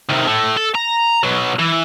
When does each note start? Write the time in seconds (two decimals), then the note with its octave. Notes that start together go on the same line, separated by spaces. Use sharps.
0.10 C3 D#3
0.28 A2 A3
0.57 A4
0.75 A#5
1.23 B2 F#3
1.59 E3